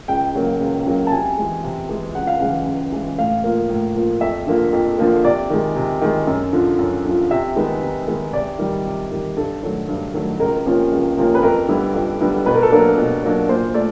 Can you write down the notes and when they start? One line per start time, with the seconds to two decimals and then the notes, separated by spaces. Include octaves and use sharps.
0.08 C#2 G5
0.35 C#3 F#3 A#3
0.60 C#2
0.86 C#3 F#3 A#3
1.07 A5
1.12 C3 G#5
1.37 E3 G#3
1.63 C3
1.89 E3 G#3
2.15 C#2 F#5
2.27 F5
2.40 C#3 E3 G#3 F#5
2.66 C#2
2.92 C#3 E3 G#3
3.18 A2 F5
3.44 F3 A#3
3.69 A2
3.96 F3 A#3
4.21 F2 E5
4.47 D3 F3 A#3
4.73 F2
4.98 D3 F3 A#3
5.24 C3 D5
5.50 D#3 G#3
5.76 C3
6.01 D#3 G#3
6.27 F#2
6.53 D3 F3
6.79 F#2
7.05 D3 F3
7.31 C3 E5
7.56 D#3 G#3 B3 D#4
7.82 C3
8.07 D#3 G#3 B3 D#4
8.33 C3 D5
8.59 D#3 G3
8.85 C3
9.11 D#3 G3
9.36 G2 A4
9.63 D#3 F#3 A3
9.88 G2
10.14 D#3 F#3 A3
10.39 C#2 A#4
10.66 C3 F3 A#3 C#4
10.92 C#2
11.17 C3 F3 A#3 C#4
11.35 B4
11.43 F2 A#4
11.68 D3 G3 B3 E4
11.94 F2
12.20 D3 G3 B3 E4
12.46 B2 B4
12.54 A#4
12.63 A4
12.71 F#3 A#3 D4 A#4
12.98 B2
13.23 F#3 A#3 D4
13.49 A#2 C5
13.74 A3 D5